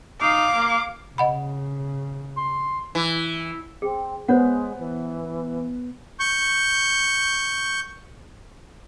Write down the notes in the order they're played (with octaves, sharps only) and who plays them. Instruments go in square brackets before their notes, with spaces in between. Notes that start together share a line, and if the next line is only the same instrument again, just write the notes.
[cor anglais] D#4 [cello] F5 [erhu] D6
[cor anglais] A#3
[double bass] C#3 [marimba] D#5 F#5 B5
[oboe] C6
[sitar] E3
[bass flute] C4 [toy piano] G#4
[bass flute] G#3 [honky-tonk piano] B3 [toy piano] C5 C#5 F#5
[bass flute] E3
[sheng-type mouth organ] C#6 G6